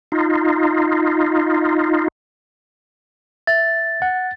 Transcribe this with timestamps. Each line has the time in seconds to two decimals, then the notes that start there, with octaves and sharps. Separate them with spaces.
0.12 D#4 F4
3.47 E5 A6
4.02 F#5